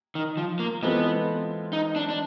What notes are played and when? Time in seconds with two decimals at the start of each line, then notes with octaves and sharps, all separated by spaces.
0.15 D#3
0.37 F3
0.60 A#3
0.82 E3 G#3 B3 C4 F4 A4
1.73 D#4
1.96 D4
2.10 D4